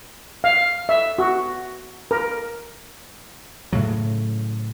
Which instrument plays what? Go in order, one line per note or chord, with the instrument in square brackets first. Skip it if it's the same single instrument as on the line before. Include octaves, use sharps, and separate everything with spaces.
[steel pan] F5
E5
F#4
A#4
[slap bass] A2 C#3 F#3